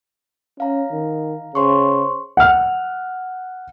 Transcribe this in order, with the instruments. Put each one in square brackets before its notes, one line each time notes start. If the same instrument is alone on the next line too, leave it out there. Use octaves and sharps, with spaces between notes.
[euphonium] C#4 [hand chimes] F5 A#5
[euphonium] D#3
[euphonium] C#3 [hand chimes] C5 C6 C#6
[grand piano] F#5 F6